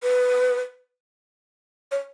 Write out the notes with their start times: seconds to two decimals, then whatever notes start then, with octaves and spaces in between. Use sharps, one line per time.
0.03 B4
1.91 C#5